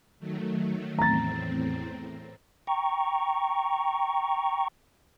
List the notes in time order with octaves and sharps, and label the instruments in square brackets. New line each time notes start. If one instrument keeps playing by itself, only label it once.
[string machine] D#3 F#3 A3
[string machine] E2 A2 C4 [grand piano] A#5 A6
[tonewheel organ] G5 A#5 C#6